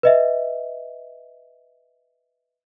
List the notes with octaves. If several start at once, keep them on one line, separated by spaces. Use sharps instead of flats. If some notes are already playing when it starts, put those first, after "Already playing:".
B4 D#5 E5